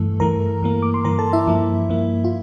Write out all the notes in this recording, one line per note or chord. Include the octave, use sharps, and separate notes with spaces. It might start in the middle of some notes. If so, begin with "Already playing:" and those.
Already playing: G2 E3 A3 A4
G2 E3 A3 A#4 A#5
G2 E3 A#3
D6
C6
G2 E3 A#3 A#4 A#5
A4 A5
E4 E5
G2 F3 A#3
G2 F3 A#3
F4